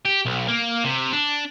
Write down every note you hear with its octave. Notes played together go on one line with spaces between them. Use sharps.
G4
B1
A#3
C3
D4